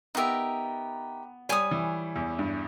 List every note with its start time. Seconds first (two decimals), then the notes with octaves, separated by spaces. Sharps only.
0.15 B3 D#4 G4 A#4 E5
1.49 G3 C#5 G#5 D#6
1.71 E3
2.16 E2
2.39 G2